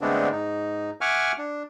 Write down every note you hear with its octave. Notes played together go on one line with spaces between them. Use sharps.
D3 G#3 A3 B3 C4 D4
G#2 D#4
E5 F#5 G#5 C#6 D6 F6
D4